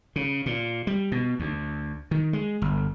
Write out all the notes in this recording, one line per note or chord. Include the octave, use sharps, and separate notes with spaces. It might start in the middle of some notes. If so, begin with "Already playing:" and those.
C#3
A#2
G3
B2
D2
D#3
G#3
G1